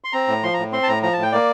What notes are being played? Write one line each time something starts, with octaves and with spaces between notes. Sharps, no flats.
C6
C4 A#5
A2
F3 C6
A2 A#5
C4 C6
A5
A2 A#5
F3 A#5
A2 A5
G5
A#3 D5